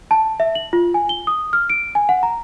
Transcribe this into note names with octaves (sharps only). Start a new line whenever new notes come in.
A5
E5
F#7
F4
G#5
G7
D#6
F6
D7
G#5
F#5
A#5